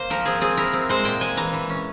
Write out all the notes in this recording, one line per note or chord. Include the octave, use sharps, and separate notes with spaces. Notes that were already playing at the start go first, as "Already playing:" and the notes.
Already playing: A#3 C5
F3 A#4
C4 G#4
C4 G#4
E4 A#4
C4
G#3 C5
A#2 G5
G#3 G#5
E3 A#5
E3
C#4